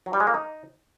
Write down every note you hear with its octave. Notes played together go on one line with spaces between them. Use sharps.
F#3
G3
G#3
A#3
D#4